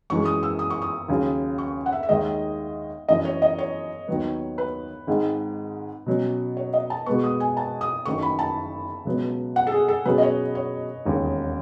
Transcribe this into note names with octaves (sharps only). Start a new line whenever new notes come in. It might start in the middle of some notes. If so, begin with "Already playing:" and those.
F#2 E3 G#3 C#6
D#6
E6
D#6
C#6
D#6
D#2 C#3 F#3
C#6
F#5
E5
E5
D#2 D#3 G#3 D#5
F#2 E3 A3 E4 D#5
C#5
D#5
C#5
D#2 D#3 F#3 B3
B4
G#1 G#2 D#3 G#3
B2 F#3 C#4
C#5
D#5
A5
B2 G#3 B3 C#6
D#6
G#5
A5
D#6
F#1 F#2 D#3 A3 C#6
B5
A5
C#2 B2 F#3 B3
F#5
A4
G#4
A4
B2 F#3 C#4 G#4 B4
D#5
C#5
C#5
E1 D#2 C#3